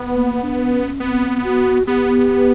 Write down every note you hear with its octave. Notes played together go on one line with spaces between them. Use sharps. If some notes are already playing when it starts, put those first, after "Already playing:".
Already playing: B3
A#3
D4
C#4
B3 C4
F#4
B3 G4